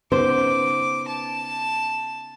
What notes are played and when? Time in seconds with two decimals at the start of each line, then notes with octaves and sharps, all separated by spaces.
0.12 C#3 B3 D#4 C5 D6
1.08 A5